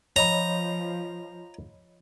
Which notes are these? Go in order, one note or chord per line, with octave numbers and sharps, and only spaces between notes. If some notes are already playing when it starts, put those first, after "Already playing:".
F3 C#5 D#5 A#5 B5